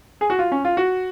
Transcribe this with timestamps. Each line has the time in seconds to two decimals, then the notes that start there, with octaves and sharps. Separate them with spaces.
0.21 G#4
0.30 F#4
0.39 F4
0.52 C#4
0.65 F4
0.77 F#4